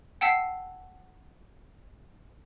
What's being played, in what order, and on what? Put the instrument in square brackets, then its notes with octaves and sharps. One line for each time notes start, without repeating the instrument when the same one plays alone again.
[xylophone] F#5 G5 A5 E6 B6 C7